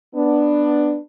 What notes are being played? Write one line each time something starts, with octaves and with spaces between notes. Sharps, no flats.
B3 D4